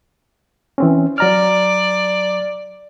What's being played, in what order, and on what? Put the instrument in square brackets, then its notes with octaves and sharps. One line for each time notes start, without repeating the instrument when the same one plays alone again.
[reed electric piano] E3 C4 C#4
[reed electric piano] F#3 A#5 F6 [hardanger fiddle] D5